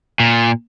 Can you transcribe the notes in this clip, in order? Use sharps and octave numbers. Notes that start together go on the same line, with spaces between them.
A#2